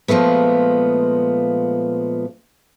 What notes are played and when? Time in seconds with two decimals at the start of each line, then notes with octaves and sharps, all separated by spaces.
0.08 A#2 F3 G#3 A3 B3